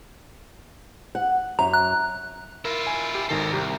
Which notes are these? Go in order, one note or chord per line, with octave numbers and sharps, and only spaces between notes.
F#5
F#2 A#5
F#6
E4 F4 A#4
G#5
G4
G#1 D#3 A4 A#5 C7
C2 G4